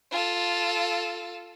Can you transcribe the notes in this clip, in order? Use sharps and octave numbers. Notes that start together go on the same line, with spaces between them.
F4 A4